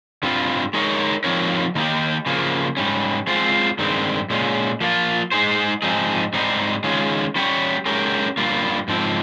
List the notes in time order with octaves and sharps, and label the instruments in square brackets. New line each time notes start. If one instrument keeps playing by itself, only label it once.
[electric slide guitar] G2 G3 C4 F4
G#3 D#4 A#4 C#5
F3 C4 D#4 A#4 C#5
D#3 A#3 D#4 G4
C#3 F3 A#3
G#2 G3 C#4
G#3 C4 F4 C5
G2 D#3 G#3 C4
A#2 G#3 C#4
F3 A#3 F4
G#3 D#4 G#4 C5
G#2 F3 C4 D#4 G#4
G#2 G3 C4 D#4
D#3 G#3 C#4 F4 G#4
G3 C#4 G4 C#5
G#3 C#4 G4 A#4
G2 G3 A#3 F4
G#2 F3 C4